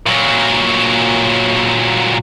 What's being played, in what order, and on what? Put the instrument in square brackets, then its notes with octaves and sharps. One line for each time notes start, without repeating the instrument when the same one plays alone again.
[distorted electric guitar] A#2 F#3